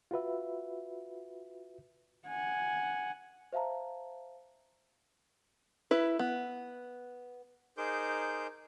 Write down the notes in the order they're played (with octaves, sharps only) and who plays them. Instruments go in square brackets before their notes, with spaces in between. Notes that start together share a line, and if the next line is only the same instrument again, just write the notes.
[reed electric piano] F4 F#4 B4 E5
[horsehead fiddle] F#5 G#5
[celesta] C5 E5 F5 A5 A#5
[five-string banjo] E4 B4
B3
[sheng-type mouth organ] D#4 G#4 A#4 C5 D6 G6